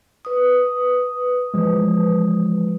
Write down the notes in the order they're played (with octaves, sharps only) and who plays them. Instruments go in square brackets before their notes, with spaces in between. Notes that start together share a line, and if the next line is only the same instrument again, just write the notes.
[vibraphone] B4 D#6
[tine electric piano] E3 F3 G#3